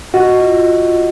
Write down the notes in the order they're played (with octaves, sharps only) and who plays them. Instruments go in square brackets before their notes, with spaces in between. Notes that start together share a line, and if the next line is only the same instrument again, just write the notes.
[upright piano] F#4 [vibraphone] D#5
[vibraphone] F4